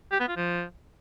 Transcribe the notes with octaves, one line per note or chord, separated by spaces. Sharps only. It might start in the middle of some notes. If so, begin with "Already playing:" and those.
G4
B3
F4
F3